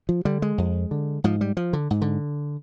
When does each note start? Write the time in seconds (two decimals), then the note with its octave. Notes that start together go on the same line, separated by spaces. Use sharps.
0.09 F3
0.25 D3 G3
0.42 G#3
0.58 F2
0.91 D3
1.24 G#2 F3
1.41 G3
1.57 F3
1.73 D3
1.91 G#2
2.02 D3